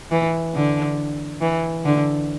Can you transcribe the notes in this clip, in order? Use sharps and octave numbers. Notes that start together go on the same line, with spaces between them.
E3
D3
E3
D3